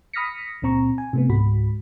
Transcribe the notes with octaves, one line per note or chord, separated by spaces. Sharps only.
B5 D#6 F6 A#6 B6 C#7
C#2 A#2 C4 A#5 C#6
G#5
C3 A3 B3
C#2 G#2 F#4 B5